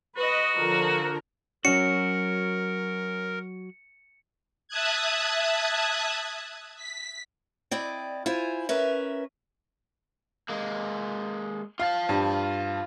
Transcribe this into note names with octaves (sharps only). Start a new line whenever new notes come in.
F#4 B4 D#5
D3 F3 A#4
F#3 C#4 F#4 A#4 C#7
E5 A5 D#6 F#6 G#6
B6
C4 E4 D5 D#5
E4 F4 C5 G#5
C#4 A#4 B4 E5
G#3 A#3
F4 F5 A5
G2